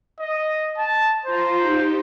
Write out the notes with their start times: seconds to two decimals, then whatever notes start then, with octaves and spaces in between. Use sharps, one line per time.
0.19 D#5
0.78 A5
1.26 F4 C5 A#5
1.60 D#4 G4